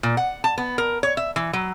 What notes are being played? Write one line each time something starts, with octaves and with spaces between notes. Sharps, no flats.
A#2
F#5
A5
B3
A#4
C#5
E5
E3
F#3